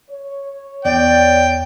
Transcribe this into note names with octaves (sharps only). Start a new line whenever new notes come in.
C#5
E2 D5 G5